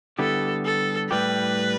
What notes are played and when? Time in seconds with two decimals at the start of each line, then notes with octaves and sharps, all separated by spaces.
0.19 D3 G3 B3 E4 G4 A4
0.65 A4
1.10 A2 G3 E4 G4 B4